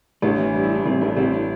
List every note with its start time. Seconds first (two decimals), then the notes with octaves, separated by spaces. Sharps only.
0.22 A1 A3 D4
0.38 E3
0.54 G2
0.63 E4
0.70 G2 D4
0.86 A1 G3 C4
1.01 A1 A3 D4
1.17 A1 C4 E4
1.33 A3 D4